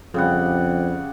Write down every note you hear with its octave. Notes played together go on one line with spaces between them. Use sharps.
F2 C#3 G3 F#5